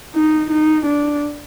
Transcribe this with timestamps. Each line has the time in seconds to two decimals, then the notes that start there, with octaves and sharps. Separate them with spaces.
0.15 D#4
0.51 D#4
0.86 D4